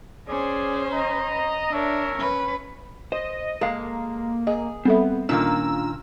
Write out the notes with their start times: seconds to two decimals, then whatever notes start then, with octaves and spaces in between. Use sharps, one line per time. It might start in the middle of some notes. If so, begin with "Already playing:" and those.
0.28 C#4 G#4 C5 D5
0.91 D#5 A#5
1.71 D4 A#4 C#5 E5
2.16 C#4 B4
3.12 C5 D#5
3.61 G#3 A#3 A4 F5
4.47 G#4 D#5
4.85 G3 B3 C4 A4 E5
5.29 A#2 D#3 A#3 C#4 D4 F4 E6